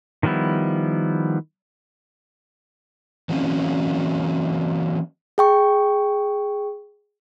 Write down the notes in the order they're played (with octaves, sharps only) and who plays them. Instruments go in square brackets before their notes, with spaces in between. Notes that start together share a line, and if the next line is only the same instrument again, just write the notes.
[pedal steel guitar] D#3 F3 G3 B3 E4
[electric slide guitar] E3 F#3 A#3 C4 C#4
[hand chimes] G#4 G5 C#6